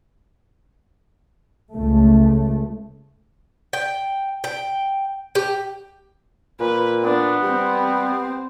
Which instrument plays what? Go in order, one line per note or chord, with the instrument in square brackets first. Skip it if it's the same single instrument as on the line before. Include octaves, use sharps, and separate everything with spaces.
[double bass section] C#2 A3
[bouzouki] G5
G5
G4
[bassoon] A#2 [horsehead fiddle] B4
[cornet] B3 [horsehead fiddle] D4
[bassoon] G3 [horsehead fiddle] C4 C5